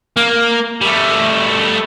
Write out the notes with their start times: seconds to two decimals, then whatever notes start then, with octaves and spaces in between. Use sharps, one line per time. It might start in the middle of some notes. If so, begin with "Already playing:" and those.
0.17 A#3
0.81 G3 A3